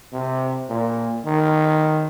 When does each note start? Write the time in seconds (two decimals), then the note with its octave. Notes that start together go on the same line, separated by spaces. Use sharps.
0.13 C3
0.69 A#2
1.26 D#3